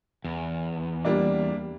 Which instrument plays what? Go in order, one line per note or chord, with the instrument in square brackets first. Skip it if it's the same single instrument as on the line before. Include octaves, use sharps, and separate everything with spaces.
[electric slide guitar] E2
[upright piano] G3 A#3 D4